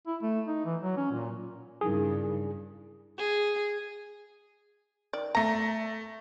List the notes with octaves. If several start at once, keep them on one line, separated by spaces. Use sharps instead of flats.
E4
A3
D#4
E3
F#3
C#4
A#2
G2 C#3 D#4 E4 G#4 A#4
G#4
D#3 D5
A3 A#5 A#6